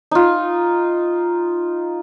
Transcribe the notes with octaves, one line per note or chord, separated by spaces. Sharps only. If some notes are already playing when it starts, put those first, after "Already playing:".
D#4 F4